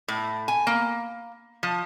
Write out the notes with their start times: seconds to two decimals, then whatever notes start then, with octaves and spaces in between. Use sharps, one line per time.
0.08 A2
0.48 G#5
0.67 A#3
1.63 F3